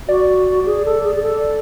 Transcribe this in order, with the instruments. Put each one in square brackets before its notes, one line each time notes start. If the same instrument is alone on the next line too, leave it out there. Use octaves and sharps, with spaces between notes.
[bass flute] F#4 [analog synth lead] D5
[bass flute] G#4
A4
G#4
G#4
A4